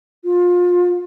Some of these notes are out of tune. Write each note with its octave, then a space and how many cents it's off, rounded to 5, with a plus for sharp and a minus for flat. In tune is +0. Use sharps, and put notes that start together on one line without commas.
F4 +25